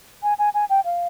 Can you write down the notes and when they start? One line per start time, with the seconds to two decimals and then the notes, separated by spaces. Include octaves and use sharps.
0.23 G#5
0.39 G#5
0.54 G#5
0.70 G5
0.85 F5